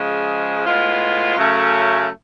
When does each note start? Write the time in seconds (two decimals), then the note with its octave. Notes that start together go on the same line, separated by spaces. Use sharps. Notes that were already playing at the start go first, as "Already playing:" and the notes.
Already playing: C#3 F3 G#3
0.64 A2 G#3 B3 F4
1.36 F#2 C#3 F#3 A3 C#4